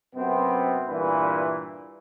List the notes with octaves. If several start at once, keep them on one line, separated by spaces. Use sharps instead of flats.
F#2 C3 B3 C4
G2 A#2 E3 B4